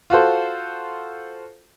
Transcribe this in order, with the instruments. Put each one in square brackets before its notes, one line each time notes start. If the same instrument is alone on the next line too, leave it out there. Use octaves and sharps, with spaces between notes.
[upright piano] F4 F#4 A4 C5